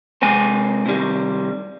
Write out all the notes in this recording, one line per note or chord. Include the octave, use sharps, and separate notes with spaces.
C3 D#3 G#3 C4 G#5
C3 D#3 G3